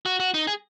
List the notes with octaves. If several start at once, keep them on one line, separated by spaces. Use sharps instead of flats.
F#4
F#4
D#4
G#4